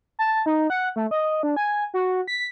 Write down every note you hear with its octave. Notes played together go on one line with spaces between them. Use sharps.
A5
D#4
F#5
A3
D#5
D4
G#5
F#4
B6